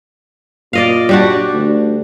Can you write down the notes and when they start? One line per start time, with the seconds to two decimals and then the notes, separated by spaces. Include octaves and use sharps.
0.73 A#2 D5 D#5 F5
1.09 G3 D4 F#4
1.54 D2